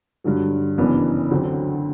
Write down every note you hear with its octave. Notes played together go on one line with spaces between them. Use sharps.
G2 D3 F#3
F#1 F#2 E3 B3 D4
D2 D3 F#3 C4